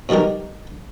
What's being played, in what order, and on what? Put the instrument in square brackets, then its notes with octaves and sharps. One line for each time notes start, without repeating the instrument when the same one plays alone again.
[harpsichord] B2 D#3 G3 G4 A#4